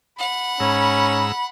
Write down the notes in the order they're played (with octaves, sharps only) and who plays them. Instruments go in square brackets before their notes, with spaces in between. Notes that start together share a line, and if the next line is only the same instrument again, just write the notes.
[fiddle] F#5 [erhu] B5
[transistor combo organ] G#2 A#5 E6 [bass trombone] C#4